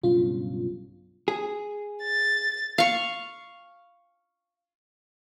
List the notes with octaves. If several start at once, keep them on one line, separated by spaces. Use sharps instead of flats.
B1 G2 C#3 F4
G#4
A6
F5 C#6